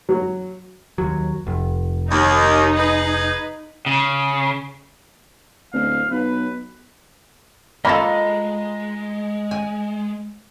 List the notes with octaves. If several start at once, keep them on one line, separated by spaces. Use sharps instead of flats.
F#3
D#2 F#3
F1
D#2 D#4
G#4 B4
C#3
D1 F5
B1 B4
G#3 A#3 F4 A4 D#5 F5 A#5 B5
G#5